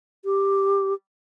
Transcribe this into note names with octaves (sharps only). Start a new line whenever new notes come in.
G4